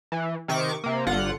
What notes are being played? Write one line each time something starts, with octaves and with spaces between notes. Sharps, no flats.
E3
C3 D#3 C#6 D6
C3 A#3
G1 D3 F4 F#5